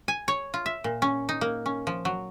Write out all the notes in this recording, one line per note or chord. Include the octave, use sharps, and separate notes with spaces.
G#5
C#5
F4
E5
A#2
C#4
D#4
A#3
C#4
F3
F#3